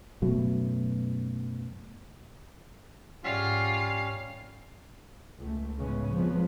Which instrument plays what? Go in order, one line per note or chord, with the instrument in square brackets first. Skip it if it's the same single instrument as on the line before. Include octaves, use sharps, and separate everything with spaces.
[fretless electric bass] F#2 B2 F#3 A3
[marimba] G#2 D5 F#5 [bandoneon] G3 C#4 [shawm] F4 [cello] F5
[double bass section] C#2 A3
A2 C#3 G#3 B3 C#4
F2 F3 G#3 B3